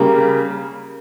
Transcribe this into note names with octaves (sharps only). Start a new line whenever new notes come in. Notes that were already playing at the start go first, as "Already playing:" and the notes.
Already playing: C#3 G3 A#3